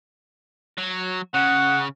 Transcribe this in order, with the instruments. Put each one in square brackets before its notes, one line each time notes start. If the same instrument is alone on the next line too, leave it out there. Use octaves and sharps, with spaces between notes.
[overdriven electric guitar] F#3
[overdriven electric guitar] C#3 [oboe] F#5